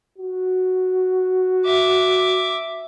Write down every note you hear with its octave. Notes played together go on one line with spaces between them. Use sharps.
F#4
E5 D6